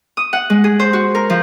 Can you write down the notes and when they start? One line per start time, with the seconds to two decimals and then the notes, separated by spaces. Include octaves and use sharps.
0.17 D#6
0.33 F#5
0.50 G#3
0.64 G#4
0.79 C5
0.93 F#4
1.15 A#4
1.30 F3